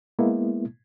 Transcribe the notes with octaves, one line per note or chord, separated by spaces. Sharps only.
G#3 A#3 B3 E4